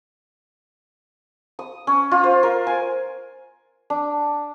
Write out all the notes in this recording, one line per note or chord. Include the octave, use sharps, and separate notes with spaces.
D#6
C#4
F4
C5
A#4
G#5
D4